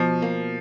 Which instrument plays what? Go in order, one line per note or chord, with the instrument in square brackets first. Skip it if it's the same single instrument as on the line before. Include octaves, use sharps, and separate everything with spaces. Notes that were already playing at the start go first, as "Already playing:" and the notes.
Already playing: [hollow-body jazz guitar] B2 [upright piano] F3
[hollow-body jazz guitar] A#3